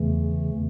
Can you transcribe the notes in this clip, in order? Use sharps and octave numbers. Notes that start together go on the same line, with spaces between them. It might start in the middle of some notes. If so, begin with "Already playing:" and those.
Already playing: E2 C#3 E3 A3